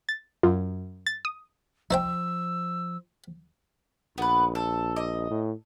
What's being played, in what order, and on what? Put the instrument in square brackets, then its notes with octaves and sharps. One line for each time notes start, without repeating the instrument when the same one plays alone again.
[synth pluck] A6
[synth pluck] F#2 [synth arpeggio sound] F4
[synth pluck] A6
[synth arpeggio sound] D#6
[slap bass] F3 [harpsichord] D#4 C5 G5 [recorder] E6
[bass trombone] A#1 [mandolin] B3 B4
[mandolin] A4
D#5
[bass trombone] A2